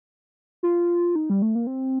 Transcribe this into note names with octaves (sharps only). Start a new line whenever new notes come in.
F4
D#4
G3
A3
A#3
C4